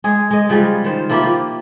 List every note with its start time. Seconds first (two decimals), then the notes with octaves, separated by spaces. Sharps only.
0.04 G#3 G#4
0.31 G#3 D#5
0.49 C#3 F3 G3 G#3
0.84 D#3 C5
1.10 F3 A#3 E4 G4
1.23 F3